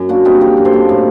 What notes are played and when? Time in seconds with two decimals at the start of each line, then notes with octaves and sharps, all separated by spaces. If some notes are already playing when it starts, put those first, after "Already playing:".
Already playing: F#2
0.09 A#3 D4 F#4
0.25 G3 C4 D#4
0.41 D3 G4 A#4
0.57 F#2
0.65 A4 C5
0.73 A#3
0.89 A2